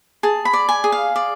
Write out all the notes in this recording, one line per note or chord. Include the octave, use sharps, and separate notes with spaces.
G#4 A5
B5
D5
G#5
G#4
F5
D5